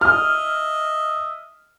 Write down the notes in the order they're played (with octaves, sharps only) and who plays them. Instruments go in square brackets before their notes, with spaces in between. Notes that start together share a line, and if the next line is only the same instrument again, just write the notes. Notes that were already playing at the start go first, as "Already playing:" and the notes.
[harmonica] D#5 E5 [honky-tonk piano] F6